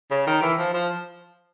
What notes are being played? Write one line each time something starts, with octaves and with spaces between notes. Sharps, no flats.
C#3
D#3
E3
F3
F3